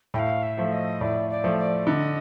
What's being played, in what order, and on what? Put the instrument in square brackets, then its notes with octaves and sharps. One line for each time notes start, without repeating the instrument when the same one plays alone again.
[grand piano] A2 [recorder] G5
[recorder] F5
E5
[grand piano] F3 A3
[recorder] D#5
[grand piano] A2 [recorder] D5
[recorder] D5
[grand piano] F3 A3
[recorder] D5
[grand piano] D3 [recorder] D#5